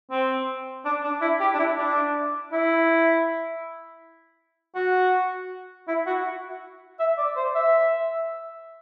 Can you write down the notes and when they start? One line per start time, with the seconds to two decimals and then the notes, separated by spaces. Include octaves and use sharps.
0.11 C4
0.85 D4
1.04 D4
1.21 E4
1.40 G4
1.54 D4
1.59 E4
1.78 D4
2.52 E4
4.75 F#4
5.88 E4
6.06 F#4
6.99 E5
7.18 D5
7.36 C5
7.55 E5